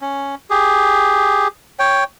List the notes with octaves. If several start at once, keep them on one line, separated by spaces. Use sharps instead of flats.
C#4
G4 G#4
C#5 G5